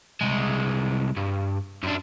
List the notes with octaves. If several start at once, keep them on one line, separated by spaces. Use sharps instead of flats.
C2 G#3
G2
F#2 D4